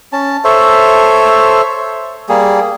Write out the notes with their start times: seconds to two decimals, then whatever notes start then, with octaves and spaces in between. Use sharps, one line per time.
0.13 C#4 A5
0.44 A4 C5 C#5 E5
2.29 G3 A#3 G#4